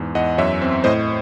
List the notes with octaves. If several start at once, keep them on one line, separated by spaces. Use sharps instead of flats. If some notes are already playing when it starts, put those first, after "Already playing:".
Already playing: E2 G#2
E2 D#5 F#5
F#2 C#5 E5
C4
A2 C5 D#5